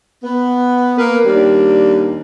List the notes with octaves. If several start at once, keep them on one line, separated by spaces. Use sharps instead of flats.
B3
A#3 A#4 B4
D#2 G3 D4